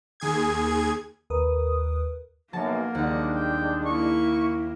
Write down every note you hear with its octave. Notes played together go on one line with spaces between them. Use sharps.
D#2 G#4 G#6
D#2 A#4 B4 D#6
B1 F#2 F#3 A#3 A5
D#2 G3 G#3 D4 G4 F#5
G5
A#3 E4 C#6